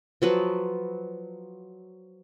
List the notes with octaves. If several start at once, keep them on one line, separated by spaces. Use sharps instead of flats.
F3 F#3 B4